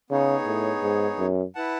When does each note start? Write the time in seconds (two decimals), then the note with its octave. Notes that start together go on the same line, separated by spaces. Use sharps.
0.10 C#3 B3 D#4 G#4 C#5
0.46 A2
0.83 G#2
1.19 F#2
1.55 E4 B4 F#5 A5